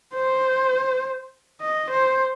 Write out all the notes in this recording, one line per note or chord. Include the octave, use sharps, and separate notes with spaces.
C5
D#5
C5